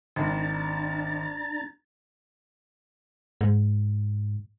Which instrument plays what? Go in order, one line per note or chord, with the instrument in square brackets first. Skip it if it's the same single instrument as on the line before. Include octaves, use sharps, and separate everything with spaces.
[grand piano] G#1 [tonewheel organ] D4 A#5 A6
[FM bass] G#2